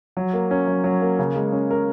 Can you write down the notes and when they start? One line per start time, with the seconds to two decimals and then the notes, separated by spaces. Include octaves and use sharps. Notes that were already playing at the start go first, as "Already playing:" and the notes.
0.17 F#3
0.33 A#3
0.51 C#4
0.68 F#3
0.84 F#3
1.02 A#3
1.19 C#3
1.36 G#3
1.52 C#4
1.71 A#4